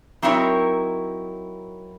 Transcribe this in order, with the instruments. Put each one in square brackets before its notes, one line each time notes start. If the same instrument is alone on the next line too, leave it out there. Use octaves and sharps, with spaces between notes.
[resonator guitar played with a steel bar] F#3 C4 D#4 E4 A#4 C#5